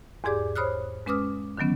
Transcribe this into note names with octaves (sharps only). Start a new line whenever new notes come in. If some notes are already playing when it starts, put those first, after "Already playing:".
E2 G#2 G4 G#4 D5 D6
C5 C#5 B5 D#6 F6 F#6
G#3 C#4 B4 D6 D#6 F6
D3 D#3 F#3 B3 C#4